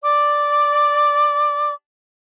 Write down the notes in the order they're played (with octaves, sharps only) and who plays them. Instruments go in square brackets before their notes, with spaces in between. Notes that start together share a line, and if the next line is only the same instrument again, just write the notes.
[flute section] D5 D6